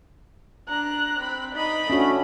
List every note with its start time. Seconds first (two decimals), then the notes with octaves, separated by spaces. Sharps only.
0.69 D4 A#5 F#6
1.19 C4 B5
1.55 D#4 D5 D#5 B5
1.90 A3 C#4 D4 F#4